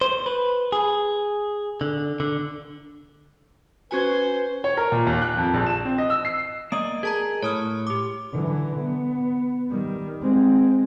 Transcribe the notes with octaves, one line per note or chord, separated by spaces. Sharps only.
C5
B4
G#4
D3
D3
C#4 F#4 B4 C5 G#5
C#5
A#4
A#2
D#2
F#6
F2
A#1
E7
C4
D#5
E6
C7
A#3 D5 D#5 D#6
G#4 A#4 A5 A#5
A2 C#5 D#6 F6
G4 D6
D3 E3
B3
D#3 G3
G#3 C4